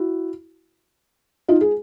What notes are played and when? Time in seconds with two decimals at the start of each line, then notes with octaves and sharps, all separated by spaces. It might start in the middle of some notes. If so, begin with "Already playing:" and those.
Already playing: E4 F#4
1.48 D#4 F4
1.61 G#4